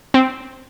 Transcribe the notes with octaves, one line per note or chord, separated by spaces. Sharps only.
C4